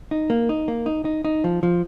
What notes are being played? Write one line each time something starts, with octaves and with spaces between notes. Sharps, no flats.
D#4
A#3
D#4
A#3
D#4
D#4
D#4
F3
F3